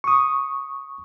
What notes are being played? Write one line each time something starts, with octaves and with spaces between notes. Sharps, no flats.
C#6 D#6